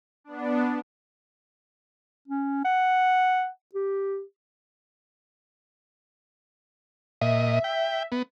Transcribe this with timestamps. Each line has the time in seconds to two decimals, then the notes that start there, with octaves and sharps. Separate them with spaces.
0.24 B3 D4
2.28 C#4
2.65 F#5
3.75 G4
7.21 A#2 D#5 E5
7.64 G5
8.12 B3